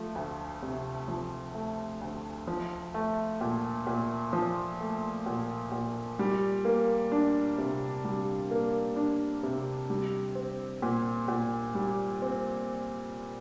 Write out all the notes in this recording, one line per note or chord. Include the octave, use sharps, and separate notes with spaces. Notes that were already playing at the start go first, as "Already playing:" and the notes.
Already playing: F3 A3
D2
C3
F3
A3
D2
F3
A3
A#2
A#2
F3
A3
A#2
A#2
G3
A#3
D4
C3
G3
A#3
D4
C3
G3
C4
A#2
A#2
G3
C4